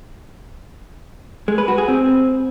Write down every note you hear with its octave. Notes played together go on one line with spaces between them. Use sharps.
G#3
B4
F#4
G#4
C4